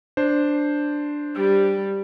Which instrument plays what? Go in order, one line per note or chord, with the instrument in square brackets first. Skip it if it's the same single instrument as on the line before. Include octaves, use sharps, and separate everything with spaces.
[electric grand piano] D4 C5
[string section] G3